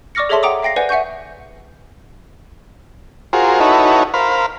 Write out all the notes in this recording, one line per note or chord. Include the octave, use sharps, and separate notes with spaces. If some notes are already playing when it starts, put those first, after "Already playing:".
D5 C#6 D6 F6 A#6 C#7
G#4 A4 C#5 E5 A5 C6
F#5 G5 A#5 D6 D#6
E5 F5 G5 A#6 C7
B4 C5 D5 F#5 G#5
E5 F#5 G#5 C#6 G6
F4 F#4 G#4 A#4 C5
D#4 E4 F#4 A4 B4 C#5
A#4 C5 F5 B5